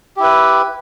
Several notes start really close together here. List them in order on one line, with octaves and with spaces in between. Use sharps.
G4 E4 B4